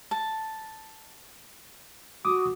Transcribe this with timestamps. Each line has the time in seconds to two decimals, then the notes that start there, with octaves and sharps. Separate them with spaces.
0.11 A5
2.25 F#4 D6 D#6